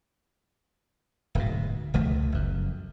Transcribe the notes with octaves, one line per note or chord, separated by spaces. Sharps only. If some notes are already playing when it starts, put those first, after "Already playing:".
D1 G#2 B2
E1 C#2 F3 A3
F#1 F#2